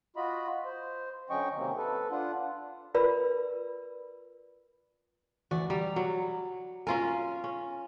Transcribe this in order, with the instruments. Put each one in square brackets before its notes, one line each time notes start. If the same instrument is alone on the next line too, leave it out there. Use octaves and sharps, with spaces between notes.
[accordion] F4 F#4 D#5 B5
C5
D3 F#3 C#4 D#5 G5 C#6
C3 D#3 F#3 A#3 C4
A4 B4
D4 F4 F#5
[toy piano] F4 A#4 B4 D5 B5 E6
[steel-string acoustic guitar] D2 E3 D5 [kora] F#4
[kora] G3 [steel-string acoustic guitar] A#5
[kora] F#3
[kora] C#4 F4 A#4 [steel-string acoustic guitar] G#5
[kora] C#4